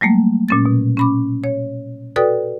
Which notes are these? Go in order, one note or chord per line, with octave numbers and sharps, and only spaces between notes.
F#3 G3 A3 A#3
A#2 C#4 A6
B2
C#4 B5 D6
C#5
F#4 A4 B4 D5 G5 D#6